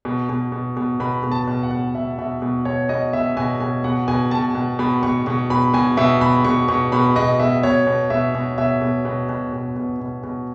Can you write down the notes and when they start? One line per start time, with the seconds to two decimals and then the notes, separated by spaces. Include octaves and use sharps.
0.05 B2
0.29 B2
0.52 B2
0.77 B2
1.00 B2 B5
1.23 B2
1.32 A5
1.48 B2
1.63 F#5
1.71 B2
1.95 B2 E5
2.18 B2 E5
2.42 B2
2.65 B2 C#5
2.89 B2 D#5
3.13 B2 E5
3.37 B2 G#5
3.60 B2 G#5
3.84 B2 F#5
4.08 B2 G#5
4.31 B2 A5
4.55 B2
4.79 B2 B5
5.03 B2 C#6
5.26 B2 C#6
5.50 B2 B5
5.73 B2 G#5
5.97 B2 E5
6.21 B2 B5
6.45 B2 C#6
6.68 B2 C#6
6.92 B2 B5
7.16 B2 D#5
7.39 B2 E5
7.63 B2 C#5
7.87 B2
8.10 B2 E5
8.35 B2
8.58 B2 E5
8.81 B2
9.05 B2
9.29 B2
9.52 B2
9.76 B2
10.00 B2
10.23 B2